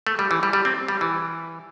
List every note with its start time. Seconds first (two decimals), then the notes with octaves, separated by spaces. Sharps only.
0.07 A3
0.19 G3
0.31 E3
0.43 G3
0.53 G3
0.65 C4
0.88 G3
1.01 E3